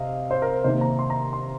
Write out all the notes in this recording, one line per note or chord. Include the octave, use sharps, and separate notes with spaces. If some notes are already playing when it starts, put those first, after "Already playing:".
Already playing: C3 D#5 F5
C5
A#4
C3 D#3 A#3 C5
A#5
C6
A#5
C6